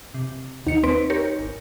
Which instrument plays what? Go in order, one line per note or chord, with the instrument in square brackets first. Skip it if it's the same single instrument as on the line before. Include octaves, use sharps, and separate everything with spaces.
[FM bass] C3
[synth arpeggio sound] D#2 C#7 [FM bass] D#4
[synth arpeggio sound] C4 B4 D7
G4 A#4 C#5
[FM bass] G#1